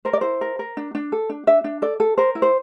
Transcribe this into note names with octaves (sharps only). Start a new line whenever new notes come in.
A#4 C5
D5
E4 C5
A#4
A#4
D4
D4
A4
D4
D4 E5
D4
A4 D5
A4
A#4 C5
E4
C5